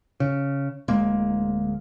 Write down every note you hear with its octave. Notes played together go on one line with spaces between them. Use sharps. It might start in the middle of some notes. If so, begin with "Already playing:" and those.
C#3
D1 G#3 A#3